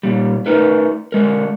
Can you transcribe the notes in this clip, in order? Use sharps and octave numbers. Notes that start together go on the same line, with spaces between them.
A#2 G3
A3 D#4 A#4 B4
D3 G#3 A#4